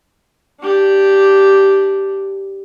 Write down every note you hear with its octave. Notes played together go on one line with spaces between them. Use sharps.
D4 G4